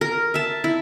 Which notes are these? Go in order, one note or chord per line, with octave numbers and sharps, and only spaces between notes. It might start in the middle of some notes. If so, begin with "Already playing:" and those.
A#4
E5 A5
E4